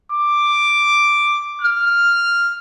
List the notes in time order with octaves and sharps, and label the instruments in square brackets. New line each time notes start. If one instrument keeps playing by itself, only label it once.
[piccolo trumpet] D6
F6